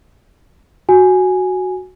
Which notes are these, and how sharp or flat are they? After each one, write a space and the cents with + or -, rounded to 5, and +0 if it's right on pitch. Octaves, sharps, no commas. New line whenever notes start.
F#4 +0 G#5 +0